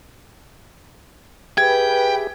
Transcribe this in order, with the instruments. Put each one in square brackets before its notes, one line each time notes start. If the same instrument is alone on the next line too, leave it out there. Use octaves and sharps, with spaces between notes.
[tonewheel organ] G4 G#4 E5 [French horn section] B4 [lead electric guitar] G5 [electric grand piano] G#6